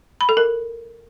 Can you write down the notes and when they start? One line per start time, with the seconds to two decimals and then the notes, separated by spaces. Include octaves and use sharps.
0.21 B5
0.29 A4
0.37 A#4